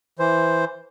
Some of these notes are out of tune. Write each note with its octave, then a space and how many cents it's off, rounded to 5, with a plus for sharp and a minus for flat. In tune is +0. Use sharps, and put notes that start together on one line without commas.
E3 +0 C5 +0